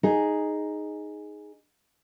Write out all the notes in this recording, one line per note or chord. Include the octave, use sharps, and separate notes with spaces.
D#4 G#4